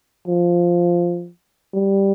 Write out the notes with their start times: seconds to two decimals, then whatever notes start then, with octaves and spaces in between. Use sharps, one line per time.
0.27 F3
1.74 G3